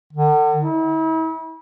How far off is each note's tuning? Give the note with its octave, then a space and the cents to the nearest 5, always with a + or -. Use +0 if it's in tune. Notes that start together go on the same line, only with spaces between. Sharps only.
D3 +35
E4 -40